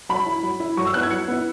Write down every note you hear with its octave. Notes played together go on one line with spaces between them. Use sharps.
F#3 B5
E4
F#3
E4
F#3 C#6
E6
B3 E4 F#6
G#6
F#3 C#7
B3 E4